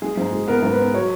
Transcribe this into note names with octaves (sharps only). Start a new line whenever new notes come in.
G#3 G#4
G#2
G#3
B3 A#4
G#2
B4
B3
F#3 C#5